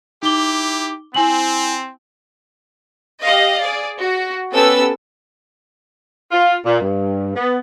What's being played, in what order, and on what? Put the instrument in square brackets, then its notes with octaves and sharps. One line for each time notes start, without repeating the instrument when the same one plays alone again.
[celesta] D#4 D6 G7 [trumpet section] E4 G4
[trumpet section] C4 [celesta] E4 G#5 F#7
[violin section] G4 D#5 F5
G#4 D5
F#4
B3 C#4 G4 A4 B4 E6
[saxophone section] F4
A#2
G2
B3